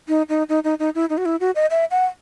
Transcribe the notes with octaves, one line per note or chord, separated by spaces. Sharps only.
D#4
D#4
D#4
D#4
D#4
E4
D#4
F#4
E4
F#4
D#5
E5
F#5